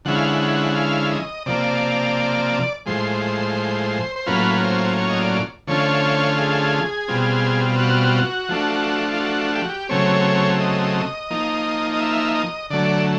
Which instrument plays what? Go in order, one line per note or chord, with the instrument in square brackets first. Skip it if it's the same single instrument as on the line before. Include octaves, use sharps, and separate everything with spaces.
[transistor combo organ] D3 F3 G#3 C#4 E4 F#5
F5
F#5
F#5
F5
D#5
C3 F3 A#3 D5
A2 F3 G#3 C5
C5
A2 F#3 A#3 C#4 F4 B4
C5
C#5
D#5
D5
D3 F3 A3 C#4 F4 C#5
G#4
B2 G3 C4 F4
F#4
F3 A3 D4
F4
F#4
G4
F#4
G4
C#3 F#3 A3 C4 C#5
D#5
F3 A#3 D#4
D#5
E5
D#5
D3 F#3 A3 D5